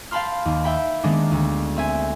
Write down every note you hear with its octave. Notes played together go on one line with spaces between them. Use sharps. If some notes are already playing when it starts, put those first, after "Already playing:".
F5 G5 A5 B5 C6 F6
D#2
E5 G5 B5
D#3 G#3 A#3 B3 D4
D2
C4 E5 G#5